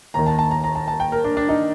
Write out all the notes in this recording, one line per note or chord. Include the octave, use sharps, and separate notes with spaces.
D#2 D#3 A#5
A5
A5
A#5
A#5
A5
A5
G5
A#4
D4
D4
D#4